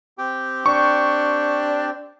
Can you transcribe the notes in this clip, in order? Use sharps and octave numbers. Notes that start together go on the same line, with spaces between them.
C4 G4 G5
D4 C#6